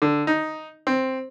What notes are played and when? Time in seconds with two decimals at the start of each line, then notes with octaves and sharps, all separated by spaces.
0.02 D3
0.27 D#4
0.87 C4